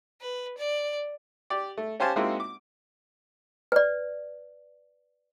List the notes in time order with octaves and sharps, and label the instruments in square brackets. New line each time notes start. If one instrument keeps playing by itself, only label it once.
[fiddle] B4
D5
[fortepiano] G4 D5
A3
C#4 G4 C5 F5 G#5 A5
G#3 A#3 C4 D#4 E4 F#4
D6
[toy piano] B4 D5